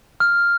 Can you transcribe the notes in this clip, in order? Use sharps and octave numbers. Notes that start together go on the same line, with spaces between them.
F6